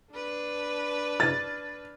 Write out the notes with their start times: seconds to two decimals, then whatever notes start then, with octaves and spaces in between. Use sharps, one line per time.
0.13 D4 B4
1.20 A6